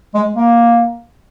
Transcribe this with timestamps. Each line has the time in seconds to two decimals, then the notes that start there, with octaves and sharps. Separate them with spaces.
0.14 G#3
0.36 A#3